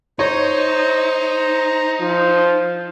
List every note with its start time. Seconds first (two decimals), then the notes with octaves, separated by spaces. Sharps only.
0.19 D#4 C5 C#5 A#5
2.01 F3